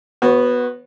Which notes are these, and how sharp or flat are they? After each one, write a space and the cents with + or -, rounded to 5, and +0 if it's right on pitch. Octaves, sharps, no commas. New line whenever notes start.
B3 -5 F#4 +0 C#5 -45